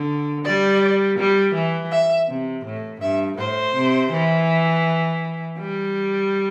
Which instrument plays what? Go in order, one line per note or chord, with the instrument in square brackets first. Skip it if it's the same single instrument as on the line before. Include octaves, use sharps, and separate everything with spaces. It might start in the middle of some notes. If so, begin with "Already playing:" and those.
Already playing: [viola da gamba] D3
[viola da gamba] G3 [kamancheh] D5
[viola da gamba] G3
E3
[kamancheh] E5
[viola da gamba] C3
A2
[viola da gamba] G2 [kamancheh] E5
[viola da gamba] A2 [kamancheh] C5
[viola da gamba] C3
E3
G3